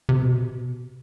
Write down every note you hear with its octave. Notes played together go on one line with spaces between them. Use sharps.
C3
B2